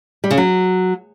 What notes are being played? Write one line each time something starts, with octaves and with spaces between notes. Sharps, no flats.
G3
C#3
F#3